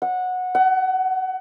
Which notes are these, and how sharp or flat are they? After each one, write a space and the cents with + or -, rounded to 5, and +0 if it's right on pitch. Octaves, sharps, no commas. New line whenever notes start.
F#5 -15
F#5 +25